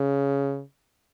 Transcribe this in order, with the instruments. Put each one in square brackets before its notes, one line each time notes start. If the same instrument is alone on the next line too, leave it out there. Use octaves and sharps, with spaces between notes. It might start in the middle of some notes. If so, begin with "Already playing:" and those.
Already playing: [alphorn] C#3